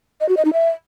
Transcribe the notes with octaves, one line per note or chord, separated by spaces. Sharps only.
D#5
F#4
D#5
D#4
E5